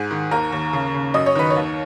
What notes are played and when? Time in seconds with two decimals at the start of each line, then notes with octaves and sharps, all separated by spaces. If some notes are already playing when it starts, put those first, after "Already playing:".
Already playing: G#2 G#4
0.11 D#3
0.31 D#2 A#4
0.52 D#2
0.73 C#3
0.94 C#3
1.14 F#2 D#5
1.26 C#5
1.35 D#3 B4
1.50 C#5
1.56 D#2